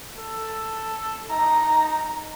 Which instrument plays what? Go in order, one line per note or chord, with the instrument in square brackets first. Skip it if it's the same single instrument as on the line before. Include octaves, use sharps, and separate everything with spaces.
[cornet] A4
[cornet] D#4 [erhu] A#5